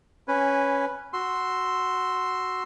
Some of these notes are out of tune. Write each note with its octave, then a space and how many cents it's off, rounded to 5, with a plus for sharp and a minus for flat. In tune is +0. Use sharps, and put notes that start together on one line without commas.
C#4 +0 B4 +0 G#5 -15
F#4 +0 C6 +0 E6 +0